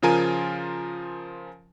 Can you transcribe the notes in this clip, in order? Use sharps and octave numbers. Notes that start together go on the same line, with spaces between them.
C#3 F3 F4 A#4 G#5 D#7